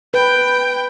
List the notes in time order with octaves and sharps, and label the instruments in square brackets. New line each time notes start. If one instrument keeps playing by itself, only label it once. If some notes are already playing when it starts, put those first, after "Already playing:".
[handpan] B4 [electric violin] G5